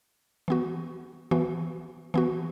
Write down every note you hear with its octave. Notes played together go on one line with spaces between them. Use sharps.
E3 B3 F#4
E3 B3 F#4
E3 B3 F#4